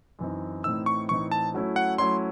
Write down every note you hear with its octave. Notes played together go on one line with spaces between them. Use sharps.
F#2 E3 C4 D#4
A2 E3 C4 D#4 E6
C#6
A2 E3 C4 D#4 C#6
A5
F#3 A3 C#4 E4
F#5
F#3 A3 C#4 E4 C6